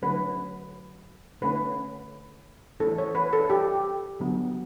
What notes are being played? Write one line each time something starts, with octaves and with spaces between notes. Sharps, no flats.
D3 F#3 A3 C#4 B4
D3 A3 C#4 B4
E3 A3 C#4 A4
C#5
B4
A4
G4
D3 F#3 B3